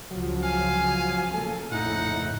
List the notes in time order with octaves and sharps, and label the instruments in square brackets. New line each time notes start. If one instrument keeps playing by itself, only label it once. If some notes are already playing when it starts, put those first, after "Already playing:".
[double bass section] C#2 C#3 F3 [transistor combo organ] F#3
[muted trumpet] F5 [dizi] G#5
[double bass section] C#3 A#3 [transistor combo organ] A4
[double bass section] A#1 F2 C#3 [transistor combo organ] A2 E4 [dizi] D#4 [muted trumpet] F#5